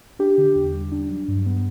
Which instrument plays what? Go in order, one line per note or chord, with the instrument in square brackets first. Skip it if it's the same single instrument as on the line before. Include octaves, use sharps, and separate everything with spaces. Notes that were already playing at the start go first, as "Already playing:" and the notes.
[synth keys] D4 [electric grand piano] G4
[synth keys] D3
E2
G3
D4
F#3
G2
B3